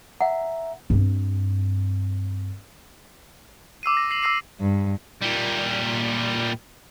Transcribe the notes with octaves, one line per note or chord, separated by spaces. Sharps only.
E5 F#5 A#5
G2 C4
D6 E6 C7 D#7
A#6
C7 F#7
D6 E6 A#6 C7 D#7
G2
A#2 G3